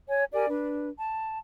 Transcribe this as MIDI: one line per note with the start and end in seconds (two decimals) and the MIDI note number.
0.09 0.25 73
0.09 0.25 80
0.33 0.46 67
0.33 0.46 70
0.33 0.46 74
0.33 0.46 80
0.49 0.89 62
0.49 0.89 71
0.98 1.38 81